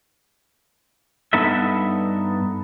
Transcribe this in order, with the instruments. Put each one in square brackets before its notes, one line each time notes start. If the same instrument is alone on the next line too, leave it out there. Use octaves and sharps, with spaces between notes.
[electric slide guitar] G2 B3 D#4 A4 E5